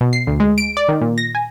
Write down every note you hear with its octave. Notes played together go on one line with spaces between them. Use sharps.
B2
C7
D2
G#3
D7
D5
D#3
A#2
A#6
G#5